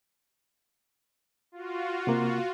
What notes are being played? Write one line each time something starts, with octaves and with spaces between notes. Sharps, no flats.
F4 F#4
C3 A#3